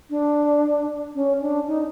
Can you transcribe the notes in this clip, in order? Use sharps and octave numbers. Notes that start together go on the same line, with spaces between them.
D4
C#4
D4
D#4